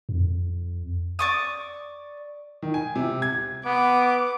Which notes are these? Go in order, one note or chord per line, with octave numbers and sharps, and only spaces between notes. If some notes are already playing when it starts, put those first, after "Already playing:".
F2
D5 C#6 D#6
D#3
G#5
C3
G#6
B3 D6